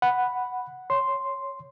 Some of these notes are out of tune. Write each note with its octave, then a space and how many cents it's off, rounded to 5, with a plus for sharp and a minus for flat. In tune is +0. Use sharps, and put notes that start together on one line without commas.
F#5 +0 B5 +0
C#5 +0 C6 +0